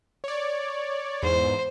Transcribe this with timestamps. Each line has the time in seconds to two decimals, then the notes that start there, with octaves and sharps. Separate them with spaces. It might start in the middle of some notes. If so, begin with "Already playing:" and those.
0.24 C#5 D5
1.23 E2 G#2 C5